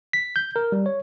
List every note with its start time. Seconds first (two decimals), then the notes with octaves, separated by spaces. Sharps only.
0.13 B6
0.36 G6
0.56 A#4
0.72 G3
0.86 C#5